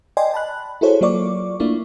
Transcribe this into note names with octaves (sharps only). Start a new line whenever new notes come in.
D5 D#5 G5 G#5 C6
A5 B5 F#6
E4 F#4 G#4 A4 C5 C#5
F#3 A#3 F4 D5 C#6 D6
A3 A#3 D4 E4 F4